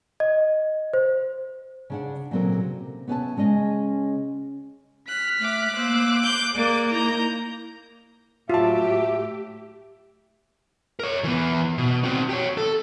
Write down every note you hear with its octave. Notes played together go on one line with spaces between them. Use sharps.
D#5
C5
C#3 D4 F#5
A#2 C#3 F#3 C4 A4 A#4
C3
B3 C#4 B4 D5 E5 A5
C#3 G#3 C#4 D#5
F6 F#6 B6
A3 D6 F#6
A#3 C5 E6
A3 C5 G6
A#3 G#4 D5
D#4 E4 A#5 G6
A2 F#3 F4 G4 E5 A5
A#4 C#5
E3 B3
B2
C4 F#4
G4 C#5
A4